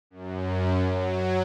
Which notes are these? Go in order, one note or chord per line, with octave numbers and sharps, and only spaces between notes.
F#2
F#3